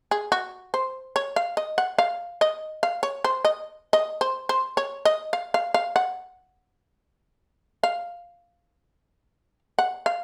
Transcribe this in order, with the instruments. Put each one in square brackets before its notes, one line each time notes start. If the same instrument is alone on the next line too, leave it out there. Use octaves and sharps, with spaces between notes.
[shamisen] G#4
F#4
C5
C#5
F5
D#5
F#5
F5
D#5
F5
C#5
C5
D#5
D#5
C5
C5
C#5
D#5
F5
F5
F5
F#5
F5
F#5
F5